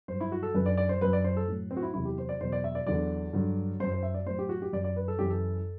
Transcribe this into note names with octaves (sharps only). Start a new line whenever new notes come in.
G2 F#3 C5
E4
F#4
A4
F#2 D3 F#3 B4
D5
D5
C5
F#2 F#3 B4
D5
C5
A4
A2 F#3
C4
F#4
E4
E2 C3 F#3 E4
G4
C5
D5
E2 B2 F#3 C5
D5
E5
D5
E2 D3 F#3 D5
G2 D3 F#3
F#2 F#3 C5
C5
E5
D5
A2 F#3 C5
G4
F#4
G4
F#2 F#3 D5
D5
B4
A4
F#2 E3 G4
A4